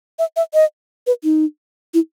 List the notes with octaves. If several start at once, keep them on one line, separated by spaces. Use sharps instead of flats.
E5
E5
D#5
B4
D#4
E4